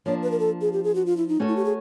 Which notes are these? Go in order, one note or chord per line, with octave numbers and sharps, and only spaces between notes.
F3 A#3 D4 C#5
B4
A#4
A4
G#4
G4
G#4
F#4
F4
E4
D#4
A3 C#4 F#4 A4 C#5
E4
G4
G#4